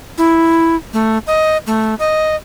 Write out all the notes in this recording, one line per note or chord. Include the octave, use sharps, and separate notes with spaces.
E4
A3
D#5
A3
D#5